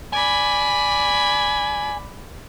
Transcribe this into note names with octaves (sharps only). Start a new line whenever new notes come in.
D5 G#5 B5